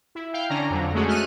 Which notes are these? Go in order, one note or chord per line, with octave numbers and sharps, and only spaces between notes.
E4
F5 G5
D3 C#4 D4 A#5
F2 D3 F#3
G#3 A3 C#4 F#4 G#4
A3 F6 F#6 D#7